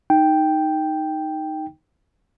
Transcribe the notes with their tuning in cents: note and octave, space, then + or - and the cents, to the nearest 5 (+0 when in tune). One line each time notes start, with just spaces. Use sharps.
D#4 +0 G5 +0